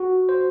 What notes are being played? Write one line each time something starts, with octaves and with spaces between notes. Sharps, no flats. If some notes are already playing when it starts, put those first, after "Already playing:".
Already playing: F#4
C5